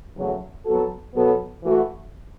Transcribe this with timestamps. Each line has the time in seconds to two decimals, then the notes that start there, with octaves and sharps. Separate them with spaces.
0.16 E2 C#3 F#3 A3
0.66 F#3 B3 F#4 A4
1.15 B2 F#3 B3 A4
1.64 E3 A3 F#4 B4